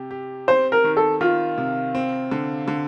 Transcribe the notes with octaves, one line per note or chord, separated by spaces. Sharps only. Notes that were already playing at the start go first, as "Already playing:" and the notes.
Already playing: C3 G4
G4
C4 C5
A#4
D#3
A4
D#3 F4
C3
C4
D3
D3